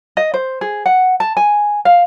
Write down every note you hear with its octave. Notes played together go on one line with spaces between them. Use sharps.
D#5
C5
G#4
F#5
A5
G#5
F5